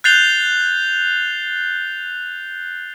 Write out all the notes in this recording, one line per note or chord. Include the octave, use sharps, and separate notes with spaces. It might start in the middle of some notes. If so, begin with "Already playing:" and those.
F#6 G6 A6 C7 F7 G7